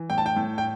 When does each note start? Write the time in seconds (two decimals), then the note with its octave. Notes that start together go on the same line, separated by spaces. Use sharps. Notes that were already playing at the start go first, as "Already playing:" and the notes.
Already playing: E3
0.10 A2 G5
0.18 A5
0.26 G5
0.36 A2
0.58 G5